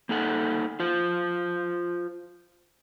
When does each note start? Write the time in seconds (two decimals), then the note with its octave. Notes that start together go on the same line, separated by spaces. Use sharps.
0.09 A#3 D#4 A4 F#5
0.80 F4 C5